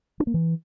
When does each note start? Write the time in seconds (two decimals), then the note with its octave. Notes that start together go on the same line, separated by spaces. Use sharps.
0.20 D4
0.27 A#3
0.34 E3